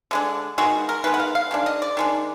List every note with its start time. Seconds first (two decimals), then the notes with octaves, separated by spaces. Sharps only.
0.11 D3 G#3 D4
0.58 D#3 G#3 B3 F#4
0.89 A#4
1.04 D#3 G#3 B3 B4
1.14 F#5
1.20 F5
1.35 F5
1.51 D#3 G#3 D4
1.66 D#5
1.82 D5
1.97 D#3 G#3 D4